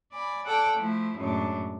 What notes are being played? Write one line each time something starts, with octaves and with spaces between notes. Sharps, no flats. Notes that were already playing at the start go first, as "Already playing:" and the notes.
D5 G#5 B5
A4 D5 F#5 G5 A5
F3 A3 E4
F#2 A2 G#3 D4